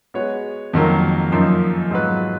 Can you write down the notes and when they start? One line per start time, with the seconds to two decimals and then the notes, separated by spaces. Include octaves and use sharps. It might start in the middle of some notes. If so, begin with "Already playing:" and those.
0.14 G#3 B3 F#4 C#5
0.73 F2 D#3 F#3 A#3
1.32 F#2 F3 A#3 D#4
1.91 G#2 F#3 B3 F4 B4